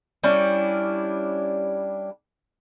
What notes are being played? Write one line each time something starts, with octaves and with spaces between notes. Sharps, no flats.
G3 C#4 D4 E4